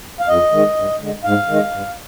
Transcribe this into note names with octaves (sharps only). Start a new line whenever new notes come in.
F5
F2 D#5
D#3 G#3
G2
D3 G#3
G#2 F5
D#3 G#3
G2